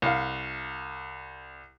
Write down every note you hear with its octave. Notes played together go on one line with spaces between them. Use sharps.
C2 F5